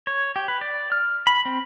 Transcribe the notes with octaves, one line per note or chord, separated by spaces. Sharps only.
C#5
G4
B4
D5
F6
B5
C4